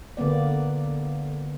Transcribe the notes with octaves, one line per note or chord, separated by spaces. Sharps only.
D3 A#3 B3 D5